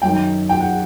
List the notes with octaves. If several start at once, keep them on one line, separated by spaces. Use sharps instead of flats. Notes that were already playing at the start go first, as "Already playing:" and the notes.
F#2 D#3 G5
G5
F#5